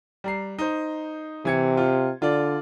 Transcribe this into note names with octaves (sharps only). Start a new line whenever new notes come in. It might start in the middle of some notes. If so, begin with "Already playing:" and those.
G3 A#5 C7
D#4 C5
C3 E3 G#6 C#7
F4
D3 F4 D5